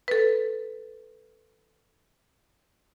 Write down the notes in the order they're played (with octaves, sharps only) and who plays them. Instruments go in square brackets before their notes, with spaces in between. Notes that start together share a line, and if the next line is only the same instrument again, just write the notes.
[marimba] A4 B4